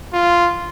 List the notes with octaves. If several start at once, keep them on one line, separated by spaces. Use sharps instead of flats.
F4